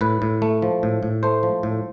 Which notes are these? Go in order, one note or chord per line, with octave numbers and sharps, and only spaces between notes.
A2 B4
A2
A3
F3
A2
A2
A3 C5
F3
A2